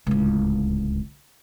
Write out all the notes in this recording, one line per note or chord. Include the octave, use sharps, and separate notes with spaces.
D1 C#2